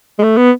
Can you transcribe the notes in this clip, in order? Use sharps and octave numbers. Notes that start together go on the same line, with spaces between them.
G#3
A3
B3